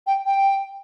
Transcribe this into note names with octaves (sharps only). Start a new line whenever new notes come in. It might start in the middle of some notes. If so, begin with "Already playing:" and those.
G5
G5